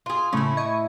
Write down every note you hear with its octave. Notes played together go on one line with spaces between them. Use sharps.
F4 G#4
A2 C#3 A3 C#4 E4
D#5 C#6 G#6